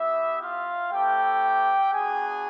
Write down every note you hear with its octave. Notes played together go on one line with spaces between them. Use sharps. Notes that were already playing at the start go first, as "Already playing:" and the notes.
Already playing: B3 E4 G4 E5
F4 F5
A3 C4 E4 G4 G5
B3 D4 F#4 G#4 G#5